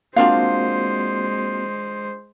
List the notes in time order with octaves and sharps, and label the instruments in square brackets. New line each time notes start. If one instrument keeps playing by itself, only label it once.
[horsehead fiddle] G#3 C5 [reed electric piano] A#3 C4 F#4 [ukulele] D4 F4 F5